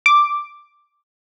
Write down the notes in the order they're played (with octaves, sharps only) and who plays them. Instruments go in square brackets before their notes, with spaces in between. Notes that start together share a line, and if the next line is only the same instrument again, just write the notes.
[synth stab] D6